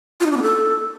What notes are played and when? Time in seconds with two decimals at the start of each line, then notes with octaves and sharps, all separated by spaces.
0.20 F4
0.26 D#4
0.31 D4
0.37 B3
0.42 A4